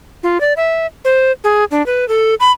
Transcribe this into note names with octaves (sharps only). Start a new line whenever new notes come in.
F4
D5
E5
C5
G#4
D4
B4
A4
B5